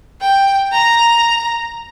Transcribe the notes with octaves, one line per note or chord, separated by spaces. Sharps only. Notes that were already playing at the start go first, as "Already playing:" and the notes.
G5
A#5